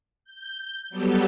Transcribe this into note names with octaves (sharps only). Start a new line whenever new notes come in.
G6
F#3 G3 B3 G4 A4